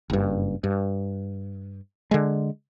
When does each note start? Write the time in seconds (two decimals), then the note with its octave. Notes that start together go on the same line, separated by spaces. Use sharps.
0.10 F#1 G2
0.64 G2
2.11 D3 G#3